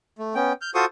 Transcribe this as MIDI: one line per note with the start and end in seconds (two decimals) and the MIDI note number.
0.19 0.35 57
0.35 0.53 59
0.35 0.53 61
0.35 0.53 79
0.61 0.71 89
0.61 0.71 91
0.75 0.85 65
0.75 0.85 66
0.75 0.85 69
0.75 0.85 72
0.75 0.85 85
0.75 0.85 87